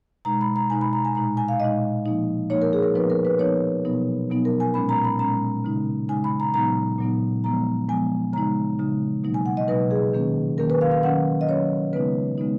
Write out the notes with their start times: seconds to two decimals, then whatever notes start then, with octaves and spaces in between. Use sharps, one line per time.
0.25 B2 G#3 D#4 A#5
0.41 B5
0.56 A#5
0.70 B2 G#3 D#4 G#5
0.81 B5
0.93 A#5
1.05 G#5
1.15 A#2 G#3 D#4 A#5
1.37 G#5
1.48 F5
1.60 A#2 G#3 D#4 D#5
2.05 F3 A#3 D#4
2.50 F3 A#3 D#4 C#5
2.62 A#4
2.73 G#4
2.83 A#4
2.94 F3 B3 D#4 B4
3.10 A#4
3.25 B4
3.39 F3 B3 D#4 C#5
3.85 B2 F#3 B3 D#4
4.30 B2 F#3 B3 D#4
4.45 A#4
4.60 G#5
4.74 A#2 G#3 C#4 B5
4.89 A#5
5.04 B5
5.19 A#2 G#3 C#4 A#5
5.64 C#3 G#3 D#4
6.09 C#3 G#3 D#4 G#5
6.24 B5
6.40 A#5
6.54 A#2 F#3 B3 D#4 A#5
6.99 A#2 F#3 B3 D#4
7.44 F3 G#3 B3 A#5
7.89 F3 G#3 B3 G#5
8.33 C#3 G#3 D#4 A#5
8.79 C#3 G#3 D#4
9.24 B2 F#3 A#3 D#4
9.34 G#5
9.46 F#5
9.57 D#5
9.68 B2 F#3 A#3 D#4 B4
9.91 G#4
10.13 D#3 A#3 C#4
10.58 D#3 A#3 C#4 A#4
10.70 B4
10.81 F5
10.91 F5
11.03 D#3 F#3 C#4 F#5
11.41 D#5
11.47 D#3 F#3 C#4 C#5
11.93 C#3 G#3 B3 D#4 B4
12.38 C#3 G#3 B3 D#4